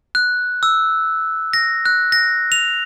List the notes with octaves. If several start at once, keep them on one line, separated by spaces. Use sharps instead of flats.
F#6
E6
A#6
F#6
A#6
F7